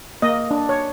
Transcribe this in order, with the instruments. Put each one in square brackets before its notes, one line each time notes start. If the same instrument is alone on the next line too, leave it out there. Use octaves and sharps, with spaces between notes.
[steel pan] A#3 D#5
D4
C#5